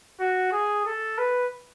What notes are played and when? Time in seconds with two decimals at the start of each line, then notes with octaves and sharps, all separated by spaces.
0.20 F#4
0.52 G#4
0.86 A4
1.18 B4